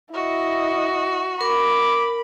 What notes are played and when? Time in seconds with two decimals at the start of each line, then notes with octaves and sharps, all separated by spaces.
0.14 E4 F#4 D#5
1.41 A#4 B5 D6